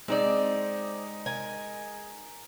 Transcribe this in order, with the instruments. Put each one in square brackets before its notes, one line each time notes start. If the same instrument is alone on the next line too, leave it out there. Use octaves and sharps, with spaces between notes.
[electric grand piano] G#3 D#4 [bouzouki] C4 D5
[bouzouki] A#4 G#5